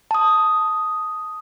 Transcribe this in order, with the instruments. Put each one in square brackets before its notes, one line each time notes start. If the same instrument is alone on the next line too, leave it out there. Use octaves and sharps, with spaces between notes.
[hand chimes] A5 D#6